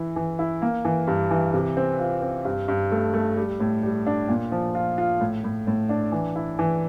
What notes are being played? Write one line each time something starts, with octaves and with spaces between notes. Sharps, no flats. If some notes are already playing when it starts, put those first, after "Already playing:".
Already playing: E3 E4
E3
E4
A#3
E3
G2
E3
C3
C4
F4
C4
G2
G2
A3
A3
G3
A2
G3
D4
A#2
F3
F4
F4
A2
A2
A2
D4
E3
E4
E3